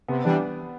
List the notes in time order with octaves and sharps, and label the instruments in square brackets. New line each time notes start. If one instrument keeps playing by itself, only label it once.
[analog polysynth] C3 [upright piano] B3
[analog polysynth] E3 G3 D4